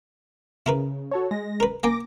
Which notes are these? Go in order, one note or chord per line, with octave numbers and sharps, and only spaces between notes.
C#3 E4 A#4 B4
F#4 A4 C#5
G#3 A#6
A#4 B4
A#3 G5 G#5 D6 A#6